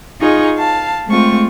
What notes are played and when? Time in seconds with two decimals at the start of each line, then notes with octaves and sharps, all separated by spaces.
0.21 D#4 F4 G#4 C#6
0.57 F5 A5
1.09 G#3 A3 C4 F4 C#6